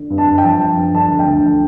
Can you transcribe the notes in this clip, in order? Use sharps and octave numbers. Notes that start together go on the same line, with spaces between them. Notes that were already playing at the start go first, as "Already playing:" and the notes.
Already playing: D3
G2
A5
G2
G5
F3 A5
F3
G2
D3 A5
D2
G5
D2
F3